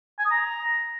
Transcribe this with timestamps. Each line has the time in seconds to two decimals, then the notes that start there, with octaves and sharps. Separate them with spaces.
0.19 G#5
0.25 D#6
0.31 A#5